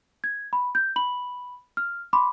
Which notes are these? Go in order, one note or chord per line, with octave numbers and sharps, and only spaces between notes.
G#6
B5
G6
B5 F#7
F6
B5 C6 D6